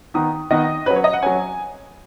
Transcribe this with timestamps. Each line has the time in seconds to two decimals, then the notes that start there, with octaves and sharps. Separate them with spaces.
0.14 D#3 B3 D#4 D#6
0.51 D#3 B3 D#4 D#5
0.86 F#3 C#4 B4
0.96 C#5
1.04 D#5
1.13 F#5
1.22 F#3 C#4 G#5